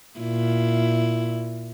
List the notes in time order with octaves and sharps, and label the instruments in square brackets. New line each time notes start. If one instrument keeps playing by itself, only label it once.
[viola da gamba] A#2 E4